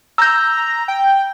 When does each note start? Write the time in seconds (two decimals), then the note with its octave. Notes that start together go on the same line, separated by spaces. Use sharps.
0.18 A#5 E6 G6
0.88 G5